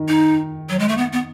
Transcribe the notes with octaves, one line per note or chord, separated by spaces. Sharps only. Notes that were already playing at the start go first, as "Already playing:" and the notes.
Already playing: D#3
D#4
F#3
G#3
A3
B3
B3